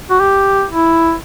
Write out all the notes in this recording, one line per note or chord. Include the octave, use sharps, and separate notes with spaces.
F#4
G4
E4